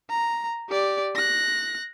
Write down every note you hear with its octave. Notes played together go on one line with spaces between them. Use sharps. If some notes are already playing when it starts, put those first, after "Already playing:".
A#5
G4 D5
F#6 A#6